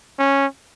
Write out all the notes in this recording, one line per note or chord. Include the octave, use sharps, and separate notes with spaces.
C#4